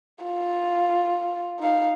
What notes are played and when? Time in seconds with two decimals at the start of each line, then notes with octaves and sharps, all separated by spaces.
0.23 F4
1.59 D#4 F5